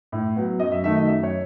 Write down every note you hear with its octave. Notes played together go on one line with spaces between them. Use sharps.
A2
F#3 B3
F#2 D#5
E5
D#3 F#3 A3 E5
D#5
F#2 E5
C#5